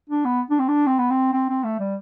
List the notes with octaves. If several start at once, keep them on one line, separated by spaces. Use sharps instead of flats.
D4
B3
D4
C4
D4
C4
B3
C4
C4
C4
A3
G3